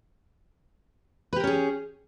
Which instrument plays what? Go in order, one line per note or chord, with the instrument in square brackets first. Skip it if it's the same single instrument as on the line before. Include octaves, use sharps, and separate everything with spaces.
[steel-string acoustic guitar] B4
G4
A#4
C#4
G#4